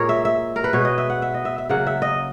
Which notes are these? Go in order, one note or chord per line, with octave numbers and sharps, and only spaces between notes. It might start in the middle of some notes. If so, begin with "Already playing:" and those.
Already playing: A#2 G#3 A#4 C#5
E5
E5
A#4
B4
B2 G#3 C#5
D#5
E5
F#5
E5
D#5
E5
E5
C#3 F#3 A#3 F#5
E5
D#5